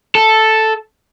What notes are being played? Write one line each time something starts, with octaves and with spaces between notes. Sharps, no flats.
A4